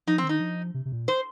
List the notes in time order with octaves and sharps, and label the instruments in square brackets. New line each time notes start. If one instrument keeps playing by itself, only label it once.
[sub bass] F3 [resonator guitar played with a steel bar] D#4
[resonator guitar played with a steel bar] C4
[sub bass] D#3
[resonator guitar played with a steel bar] D#4
[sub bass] F3
C3
C3
A#2
[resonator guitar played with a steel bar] C5